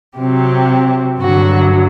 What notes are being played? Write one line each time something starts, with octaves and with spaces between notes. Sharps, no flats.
C3 F#3 C4 G4
G2 D3 F#3 F#4